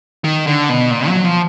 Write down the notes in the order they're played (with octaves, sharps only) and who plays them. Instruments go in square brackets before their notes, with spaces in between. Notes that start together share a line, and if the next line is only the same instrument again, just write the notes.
[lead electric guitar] D#3
D3
B2
A#2
F#3
F3